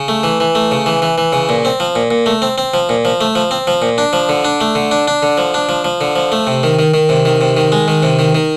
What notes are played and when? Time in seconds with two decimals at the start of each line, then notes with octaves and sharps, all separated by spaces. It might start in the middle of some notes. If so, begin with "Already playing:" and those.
Already playing: C#3
0.08 A3
0.24 E3
0.40 E3
0.55 A3
0.71 C#3
0.86 E3
1.02 E3
1.18 E3
1.33 C#3
1.49 A#2
1.65 C4
1.80 F3
1.95 A#2
2.11 A#2
2.26 A3
2.42 C4
2.58 C4
2.74 F3
2.89 A#2
3.05 F3
3.21 A3
3.35 F3
3.51 C4
3.67 F3
3.82 A#2
3.98 D4
4.13 F3
4.29 D3
4.45 D4
4.61 A3
4.75 D3
4.91 D4
5.07 D4
5.22 D3
5.38 F3
5.54 D4
5.69 F3
5.84 F3
6.01 D3
6.16 F3
6.32 A3
6.47 C3
6.63 D#3
6.79 D#3
6.94 D#3
7.09 C3
7.25 D#3
7.41 C3
7.57 D#3
7.72 G#3
7.88 D#3
8.03 C3
8.19 D#3
8.35 D#3